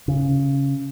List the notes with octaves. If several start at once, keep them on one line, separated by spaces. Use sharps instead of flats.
C#3